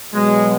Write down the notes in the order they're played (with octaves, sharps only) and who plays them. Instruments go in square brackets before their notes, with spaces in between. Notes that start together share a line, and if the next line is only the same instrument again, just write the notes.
[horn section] B2 F#3 G#3